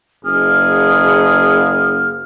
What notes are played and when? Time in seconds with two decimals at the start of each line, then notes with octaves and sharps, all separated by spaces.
0.25 F#1 G#4 F6